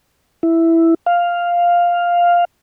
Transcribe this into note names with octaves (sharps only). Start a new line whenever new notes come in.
E4
F5